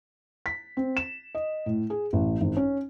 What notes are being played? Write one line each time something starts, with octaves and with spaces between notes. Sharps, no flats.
B6
C4
E7
D#5
A2
G#4
A1
G#1
C#4